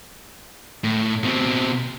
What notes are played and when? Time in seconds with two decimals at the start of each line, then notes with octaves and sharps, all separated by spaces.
0.84 A2
1.24 B2 C4